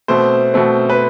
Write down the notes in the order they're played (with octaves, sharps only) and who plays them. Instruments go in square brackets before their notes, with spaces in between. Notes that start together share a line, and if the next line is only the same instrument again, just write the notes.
[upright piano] B2 A3 C4 C5
B2 A3 C4
B4